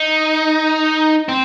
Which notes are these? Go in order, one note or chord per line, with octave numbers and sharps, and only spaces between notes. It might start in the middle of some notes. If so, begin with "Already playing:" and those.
Already playing: D#4
C4